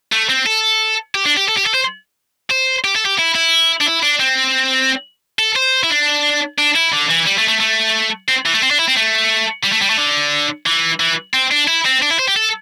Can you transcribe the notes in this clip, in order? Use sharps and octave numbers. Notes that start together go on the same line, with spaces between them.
A3
C4
A4
G4
D4
G4
A4
G4
A4
C5
C5
G4
A4
G4
E4
E4
D4
E4
D4
C4
A4
C5
E4
D4
D4
E4
D3
E3
G3
A3
A3
A3
C4
E3
A3
C4
D4
E4
C4
A3
G3
A3
G3
A3
D3
E3
E3
C4
D4
E4
C4
D4
E4
C5
G4
A4